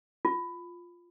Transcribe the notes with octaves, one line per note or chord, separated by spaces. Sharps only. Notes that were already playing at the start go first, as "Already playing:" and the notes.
F4